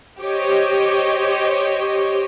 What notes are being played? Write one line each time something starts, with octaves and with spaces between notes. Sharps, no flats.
G4 C5 C#5 D#5